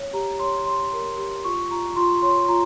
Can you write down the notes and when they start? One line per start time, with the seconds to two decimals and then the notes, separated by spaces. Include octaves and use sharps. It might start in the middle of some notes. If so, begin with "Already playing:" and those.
Already playing: C#5
0.13 G4 A#5
0.39 C#5 C6
0.66 C#5 C6
0.93 A#4
1.18 G4
1.44 F4 C#6
1.71 F4 A#5
1.96 F4 C6
2.22 C#5 C6
2.48 F4 A#5